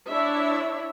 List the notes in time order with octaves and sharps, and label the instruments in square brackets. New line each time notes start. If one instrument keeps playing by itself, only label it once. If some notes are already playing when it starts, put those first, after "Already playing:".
[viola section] D4 E4 C#5 E5